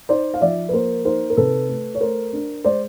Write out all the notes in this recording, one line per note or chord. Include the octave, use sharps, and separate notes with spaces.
D#4 C5 D5
F5
F3 D5 E5
B4
A#3 A#4 C5
D#4 A#4 C5
A#4
C3 A4 B4
A3
C#5
A3 A#4 C5
D4
G#3 C5 D5